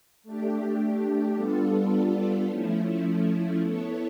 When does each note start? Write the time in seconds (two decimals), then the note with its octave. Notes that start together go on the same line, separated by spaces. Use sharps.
0.23 A3 D4 G4
1.35 G3 B3 D4 F4 A4
2.47 F3 A3 C#4 E4
3.60 B3 E4 A4 C#5